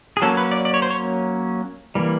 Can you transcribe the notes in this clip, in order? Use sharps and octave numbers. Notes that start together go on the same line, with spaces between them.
G#4
F#3 A#3 C#4 A4
B4
D5
D5
C#5
C5
C#5
E3 G3 A#3